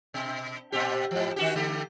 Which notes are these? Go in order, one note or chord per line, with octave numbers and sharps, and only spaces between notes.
B2
A#2 C4 G4
G#2 F3
D#3 F#4 G4
D3 A3 G4